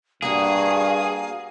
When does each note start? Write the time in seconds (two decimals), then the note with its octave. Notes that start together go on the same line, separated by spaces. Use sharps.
0.22 G2 A#3 F#4 G#4 F5